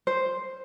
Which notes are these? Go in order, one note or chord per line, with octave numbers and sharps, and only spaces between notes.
C5